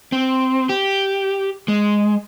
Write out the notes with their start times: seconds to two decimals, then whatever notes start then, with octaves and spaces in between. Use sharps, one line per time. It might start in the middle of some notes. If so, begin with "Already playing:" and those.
0.12 C4
0.69 G4
1.68 G#3